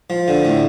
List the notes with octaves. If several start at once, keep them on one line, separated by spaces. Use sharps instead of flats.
F3
D3
A2